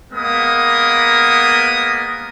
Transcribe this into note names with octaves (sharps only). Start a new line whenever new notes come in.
G#3 A#3 B3 A#4 D#6